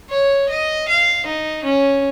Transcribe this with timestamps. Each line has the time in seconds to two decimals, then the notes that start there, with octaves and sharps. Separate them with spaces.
0.10 C#5
0.49 D#5
0.88 F5
1.26 D#4
1.64 C#4